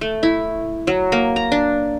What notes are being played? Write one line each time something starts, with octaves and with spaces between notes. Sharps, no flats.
A3
E4
F#3
A#3
A#5
D4